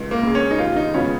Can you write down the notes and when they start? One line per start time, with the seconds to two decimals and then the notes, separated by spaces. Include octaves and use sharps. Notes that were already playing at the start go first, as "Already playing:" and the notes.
Already playing: C#2
0.11 A#3
0.23 C#3 G#3
0.35 C#4
0.51 D#4
0.58 D#2 F4
0.76 D#4
0.94 C#3 G#3 B3 C#4 F4